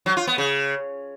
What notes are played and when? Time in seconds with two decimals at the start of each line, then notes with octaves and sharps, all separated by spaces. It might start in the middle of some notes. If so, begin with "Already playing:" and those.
0.06 F#3
0.17 F4
0.27 B3
0.38 C#3